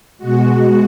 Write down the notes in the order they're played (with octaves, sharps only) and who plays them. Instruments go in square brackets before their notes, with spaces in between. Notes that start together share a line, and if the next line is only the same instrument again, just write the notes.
[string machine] B2 G#3 F#4